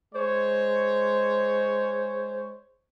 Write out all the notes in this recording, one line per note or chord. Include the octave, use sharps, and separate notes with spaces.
G#3 C5 C#5